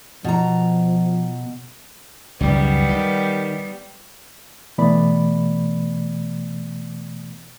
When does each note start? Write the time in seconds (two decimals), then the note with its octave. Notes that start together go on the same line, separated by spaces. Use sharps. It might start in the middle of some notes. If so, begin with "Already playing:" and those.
0.24 B2 F3 A#5
2.41 C#2 F#2 D#3 G3 B3
2.89 D#3
4.78 B2 E3 A3 B3 D5 B5